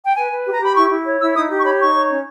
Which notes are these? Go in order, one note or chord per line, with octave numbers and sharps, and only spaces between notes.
G5
B4 G#5
B4
G4
A#5
G4 B5
E4 C#6
E4
C#5
E4 E6
D#4 D#6
G4
C#6
C#5 B5
D#4 C#6
C#5
C#4